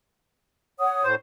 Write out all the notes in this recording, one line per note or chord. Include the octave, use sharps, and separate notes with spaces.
C#5 F#5 D#6
A2 C5